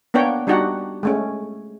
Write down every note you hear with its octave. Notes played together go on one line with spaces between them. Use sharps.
A#3 B3 D4 C#5 G5
G3 D4 D#4 F#4 G4 F#5
G#3 A3 C#4